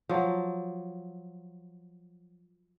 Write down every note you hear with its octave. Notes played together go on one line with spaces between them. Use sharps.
F3 F#3